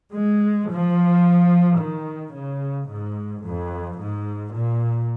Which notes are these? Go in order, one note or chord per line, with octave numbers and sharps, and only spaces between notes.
G#3
F3
D#3
C#3
G#2
F2
G#2
A#2